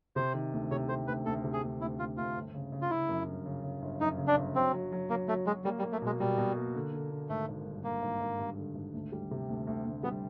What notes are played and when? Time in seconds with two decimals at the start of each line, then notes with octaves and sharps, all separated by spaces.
0.16 C3 C5
0.34 D#3
0.53 D2
0.71 C3 C#5
0.89 C3 C5
1.07 D2 B4
1.26 D2 A4
1.44 C3
1.53 G#4
1.62 D2
1.81 D2 E4
1.99 D2 F4
2.17 D2 F4
2.36 G1
2.54 C#3
2.72 C#3
2.82 F4
2.90 C#3 E4
3.09 F#2
3.28 G1
3.46 C#3
3.64 C#3
3.82 G1
4.01 F#2 D#4
4.18 C#3
4.27 D4
4.37 G1
4.56 F#3 C4
4.73 F#3
4.92 F#3
5.10 F#3 A#3
5.28 F#3 A3
5.46 F#3 G#3
5.64 G3 A#3
5.79 G3
5.83 A#3
5.92 A3
6.02 B2 G#3
6.20 B2 G3
6.38 B2
6.57 A#3
6.75 D3
6.93 D3
7.11 D3
7.29 G#1 A3
7.48 G#1
7.65 G2
7.84 G2 A#3
8.02 G#1
8.20 G#1
8.39 G2
8.58 D3
8.75 G#1
8.94 D2
9.12 G3
9.31 C3
9.49 D2
9.67 D2
9.85 D2
10.03 G3 B3